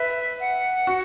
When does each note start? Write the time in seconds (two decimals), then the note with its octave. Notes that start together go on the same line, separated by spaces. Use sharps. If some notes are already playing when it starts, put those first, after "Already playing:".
Already playing: B4 E5
0.40 F#5
0.87 F#4